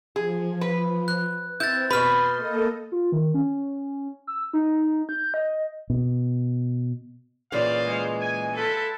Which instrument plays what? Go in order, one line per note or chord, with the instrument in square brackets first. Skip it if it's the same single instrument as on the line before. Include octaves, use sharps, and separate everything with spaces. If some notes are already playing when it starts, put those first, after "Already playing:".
[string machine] F3 [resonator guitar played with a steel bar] G#4
[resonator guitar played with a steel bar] B4
[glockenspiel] F#6
[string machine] C4 [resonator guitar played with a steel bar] E4 [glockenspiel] G6 A6
[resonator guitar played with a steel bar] B2 B4 [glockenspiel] B5 F6 [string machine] C6
[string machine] A#3 A4 D#5
[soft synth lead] F4
D#3
C#4
E6
D#4
G6
D#5
[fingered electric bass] B2
[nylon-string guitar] A#2 C#3 E3 [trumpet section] C5 D#5 F5 [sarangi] D5
[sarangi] G#3
[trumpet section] G#5
[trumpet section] E4 F4 B4 [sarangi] A4